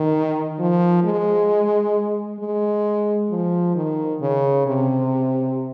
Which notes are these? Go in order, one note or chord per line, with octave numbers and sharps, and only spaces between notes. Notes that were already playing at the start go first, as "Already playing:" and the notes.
Already playing: D#3
F3
G#3
G#3
F3
D#3
C#3
C3